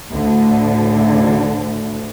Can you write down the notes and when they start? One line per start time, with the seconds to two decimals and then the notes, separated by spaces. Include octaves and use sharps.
0.11 D2 A2 D3